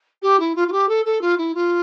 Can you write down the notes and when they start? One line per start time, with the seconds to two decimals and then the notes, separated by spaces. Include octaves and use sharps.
0.22 G4
0.39 E4
0.55 F4
0.67 F4
0.72 G4
0.88 A4
1.05 A4
1.21 F4
1.37 E4
1.54 F4